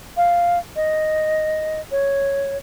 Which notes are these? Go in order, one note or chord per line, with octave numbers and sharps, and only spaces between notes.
F5
D#5
C#5